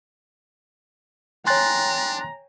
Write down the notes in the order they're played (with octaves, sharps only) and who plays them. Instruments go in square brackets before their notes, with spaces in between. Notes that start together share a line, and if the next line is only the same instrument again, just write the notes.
[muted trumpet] D4 [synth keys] C#5 G5 G#5 [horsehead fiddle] A#5 [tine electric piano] C6 F#6 A6